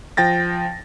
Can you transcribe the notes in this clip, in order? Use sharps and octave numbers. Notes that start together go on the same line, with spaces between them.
F3 G5 A6 A#6